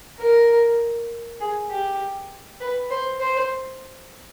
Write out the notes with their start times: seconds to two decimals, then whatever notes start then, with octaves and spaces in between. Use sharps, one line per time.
0.19 A#4
1.40 G#4
1.70 G4
2.60 B4
2.90 C5
3.20 C5